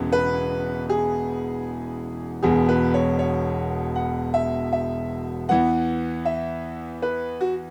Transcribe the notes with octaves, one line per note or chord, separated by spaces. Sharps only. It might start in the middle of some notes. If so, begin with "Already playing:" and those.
Already playing: E1 E2 C#3 E3 B3
B4
G#4
E1 E2 B2 B3 G#4
B4
C#5
C#5
F#5
E5
E5
E2 E3 B3 F#5
E5
B4
F#4